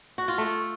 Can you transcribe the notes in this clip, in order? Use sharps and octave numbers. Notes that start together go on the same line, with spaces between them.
F#4
F4
A3